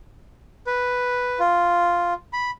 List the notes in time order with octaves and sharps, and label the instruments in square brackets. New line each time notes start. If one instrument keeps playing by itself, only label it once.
[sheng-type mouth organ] B4
F4
B5